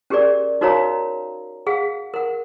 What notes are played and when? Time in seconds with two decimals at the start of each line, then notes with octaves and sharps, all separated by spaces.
0.10 C#4 G4 G#4 A#4 D5
0.61 D#4 F#4 A#4 C#5 F5 A#5
1.67 G#4 F5 F#5
2.14 A#4 F#5